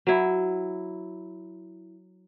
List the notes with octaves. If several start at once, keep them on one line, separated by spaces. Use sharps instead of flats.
F#3 E4